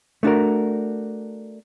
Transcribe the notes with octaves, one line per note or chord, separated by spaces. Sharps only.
A3 D4 F#4 A#4